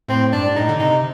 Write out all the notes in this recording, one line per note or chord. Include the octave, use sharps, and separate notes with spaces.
A2 C4
G2 D4
A2 D#4
D3
C3 D#4